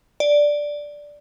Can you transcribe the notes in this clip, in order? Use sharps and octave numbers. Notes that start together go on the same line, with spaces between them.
D5